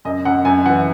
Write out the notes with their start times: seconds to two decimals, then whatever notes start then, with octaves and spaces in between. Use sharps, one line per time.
0.05 F#2 D#5
0.25 F#2 F#5
0.45 F#2 G#5
0.65 E3 F#5